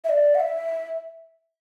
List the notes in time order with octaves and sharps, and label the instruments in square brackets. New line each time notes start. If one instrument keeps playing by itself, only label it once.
[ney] E5
D5
F#5
E5